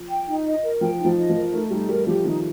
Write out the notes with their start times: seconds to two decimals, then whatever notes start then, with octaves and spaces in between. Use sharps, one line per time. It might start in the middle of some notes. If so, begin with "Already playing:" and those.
Already playing: F3
0.09 G5
0.27 D#4
0.45 D#5
0.63 A#4
0.81 F3 G5
0.99 D#4
1.05 F3
1.17 D#5
1.30 F3
1.35 A#4
1.53 A3 D#4
1.71 G3 D#4
1.89 G3 A#4
2.07 F3 G4
2.25 D#3 D#4